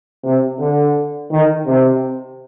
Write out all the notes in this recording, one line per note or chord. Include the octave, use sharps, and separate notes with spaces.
C3
D3
D#3
C3